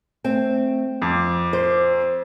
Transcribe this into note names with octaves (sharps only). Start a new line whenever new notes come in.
A3 C4
F2 D6
C5